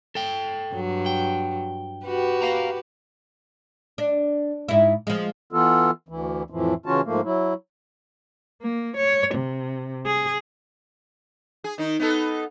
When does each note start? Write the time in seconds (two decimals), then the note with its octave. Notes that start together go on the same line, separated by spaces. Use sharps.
0.15 A4 G5
0.74 G2 F#3
1.06 G5
2.06 F#4 G4 B4
2.42 F5 A#5
3.98 D4
4.68 G#2 E4
5.07 F3 G#3
5.53 E3 B3 F4 A4
6.09 D2 E3
6.50 F2 A2 E3 F3
6.86 C#3 E3 C#4 F4 F#4 A5
7.04 G#2 F3 A3 A#3
7.24 F#3 E4
8.62 A#3
8.96 C#5
9.34 C3
10.06 G#4
11.64 G#4
11.78 D#3 D#4
12.00 B3 D#4 A4